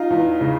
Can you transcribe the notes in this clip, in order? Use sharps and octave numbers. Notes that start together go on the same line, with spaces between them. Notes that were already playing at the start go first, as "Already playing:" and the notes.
Already playing: D#4 F4
E2
C#3